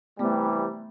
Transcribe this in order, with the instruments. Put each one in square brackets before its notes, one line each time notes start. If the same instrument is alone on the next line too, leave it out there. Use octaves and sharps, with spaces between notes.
[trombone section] C3 E3 G3 [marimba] A3 B3